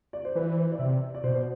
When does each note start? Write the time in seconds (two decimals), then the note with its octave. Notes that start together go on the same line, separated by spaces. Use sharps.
0.13 D5
0.25 C5
0.35 E3 B4
0.58 C5
0.72 D5
0.79 C3 E5
1.14 D5
1.24 B2 C5